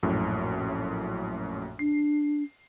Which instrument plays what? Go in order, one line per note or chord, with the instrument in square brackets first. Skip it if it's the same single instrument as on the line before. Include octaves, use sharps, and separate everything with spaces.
[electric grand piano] A#1 F#2 A2
[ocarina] D4 [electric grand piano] C7